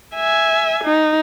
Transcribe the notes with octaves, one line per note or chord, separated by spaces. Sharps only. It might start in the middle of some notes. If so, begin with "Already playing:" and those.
E5 G#5
D#4